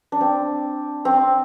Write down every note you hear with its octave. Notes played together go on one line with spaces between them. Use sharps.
D4
C4
C4